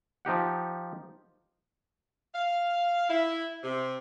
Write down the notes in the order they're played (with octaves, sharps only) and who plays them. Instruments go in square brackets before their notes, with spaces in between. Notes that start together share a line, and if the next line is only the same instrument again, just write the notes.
[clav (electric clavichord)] F3 D#4 G4 F#5
[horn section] F5
E4
C3